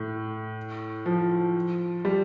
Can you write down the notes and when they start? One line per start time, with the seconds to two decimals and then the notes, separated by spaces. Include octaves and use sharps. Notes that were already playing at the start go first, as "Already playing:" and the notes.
Already playing: A2
1.06 F3
2.05 G3